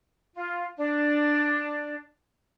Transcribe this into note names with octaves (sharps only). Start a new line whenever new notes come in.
F4
D4